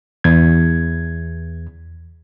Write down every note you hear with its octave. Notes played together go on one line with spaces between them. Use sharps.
E2 G#6